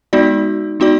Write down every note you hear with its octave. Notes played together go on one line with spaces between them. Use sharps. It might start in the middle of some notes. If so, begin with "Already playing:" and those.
G#3 B3 D#4 F#4 D5
G#3 B3 D#4 F#4 D5